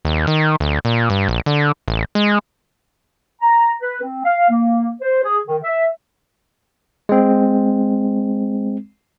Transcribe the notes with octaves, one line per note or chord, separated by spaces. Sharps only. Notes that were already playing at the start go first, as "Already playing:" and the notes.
D#2
D#3
D2
A#2
G2
A#1
D3
A1
G#3
A#5
B4
C4
F5
A#3
C5
G#4
D#3
E5
G#3 C4